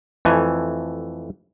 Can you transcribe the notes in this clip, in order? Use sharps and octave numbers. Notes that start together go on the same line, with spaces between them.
F2 E3 A3 G#5